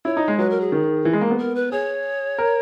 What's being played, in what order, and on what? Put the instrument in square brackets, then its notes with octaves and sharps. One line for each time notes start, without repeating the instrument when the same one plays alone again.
[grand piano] E4 [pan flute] C#5
[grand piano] D#4
G#3
[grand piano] F#3 [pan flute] B4
[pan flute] A#4
G#4
[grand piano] D#3
E3
G#3
A#3
B3
[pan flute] A#4
B4
[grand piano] G#4 [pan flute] C#5
[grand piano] A#4